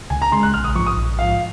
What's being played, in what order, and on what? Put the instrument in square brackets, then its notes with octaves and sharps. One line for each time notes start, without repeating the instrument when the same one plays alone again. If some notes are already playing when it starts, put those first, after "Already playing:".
[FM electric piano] C#2 [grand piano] G#5
[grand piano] A#5
[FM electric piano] C#3 G#3 [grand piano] C6
[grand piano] F#6
[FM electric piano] A#1 [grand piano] F6
[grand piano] D#6
[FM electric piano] G#2 F3 [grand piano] C#6
[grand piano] D#6
[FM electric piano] A#1
[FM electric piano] G#2 F3 [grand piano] F5